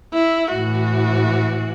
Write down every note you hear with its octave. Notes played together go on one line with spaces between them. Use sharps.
E4
A2 E3 F#4